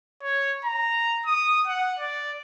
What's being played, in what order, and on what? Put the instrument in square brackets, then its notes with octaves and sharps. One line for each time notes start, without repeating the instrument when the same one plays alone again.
[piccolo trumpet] C#5
A#5
D#6
F#5
D5